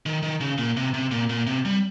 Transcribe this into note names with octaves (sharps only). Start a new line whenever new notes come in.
D#3
D#3
C#3
A#2
C3
C3
A#2
A#2
C3
G3